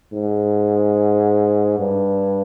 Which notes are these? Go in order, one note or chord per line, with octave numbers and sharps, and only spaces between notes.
G#2
G2